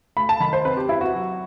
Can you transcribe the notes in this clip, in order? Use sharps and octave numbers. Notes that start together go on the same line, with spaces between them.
A3 B5
A5
D#3 B5
C5
C4 B4
G4
C4 E4
F#4
F#3